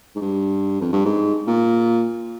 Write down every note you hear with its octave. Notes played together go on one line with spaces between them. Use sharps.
G#2
G2
F2
G2
G#2
A#2